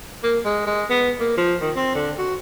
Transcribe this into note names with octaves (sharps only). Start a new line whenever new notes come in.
A#3
G#3
G#3
B3
A#3
F3
D#3
C4
D3
F#4